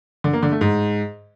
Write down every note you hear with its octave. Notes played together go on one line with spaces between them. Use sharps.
D3
A#3
D3
A3
G#2